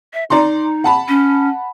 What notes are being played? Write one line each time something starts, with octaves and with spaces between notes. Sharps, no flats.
E5
D#4 D5 A#5 C6
F#5 A5 B5
C#4